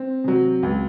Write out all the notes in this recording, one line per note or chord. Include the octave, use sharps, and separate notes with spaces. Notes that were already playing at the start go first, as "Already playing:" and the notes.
Already playing: C4
C3 F#3
C#2